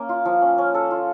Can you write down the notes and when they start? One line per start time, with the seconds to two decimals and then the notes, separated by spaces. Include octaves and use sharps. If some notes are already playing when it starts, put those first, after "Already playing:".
Already playing: A#3 C#4
0.09 F4
0.25 F3
0.42 C#4
0.58 C#4
0.74 A4
0.91 F4